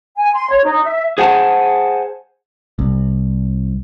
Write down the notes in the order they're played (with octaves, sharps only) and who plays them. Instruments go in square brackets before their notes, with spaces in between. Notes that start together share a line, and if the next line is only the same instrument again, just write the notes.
[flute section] G#5
C6
C#5
D#4
E5
[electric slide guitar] G#4 C5 F#5 G#5 A5
[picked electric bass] C2